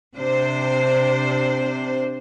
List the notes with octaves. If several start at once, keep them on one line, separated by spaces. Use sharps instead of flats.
C3 D4 C5